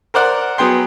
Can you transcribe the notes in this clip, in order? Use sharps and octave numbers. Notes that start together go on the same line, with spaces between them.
A#4 C5 D5 F#5
F#3 B3 G#4 G5 C6